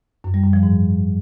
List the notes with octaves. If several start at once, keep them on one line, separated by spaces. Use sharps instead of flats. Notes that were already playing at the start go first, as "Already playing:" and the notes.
F#2
G3
F#2
F3
G#2